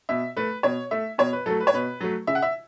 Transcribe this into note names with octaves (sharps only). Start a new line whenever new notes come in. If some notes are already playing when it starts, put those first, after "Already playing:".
B2 E5
A3 B4
B2 C#5
A3 E5
B2 C#5
B4
F#3 A3 A4
B4
C#5
B2 B4
F#3 A3
C#3 E5
F#5
E5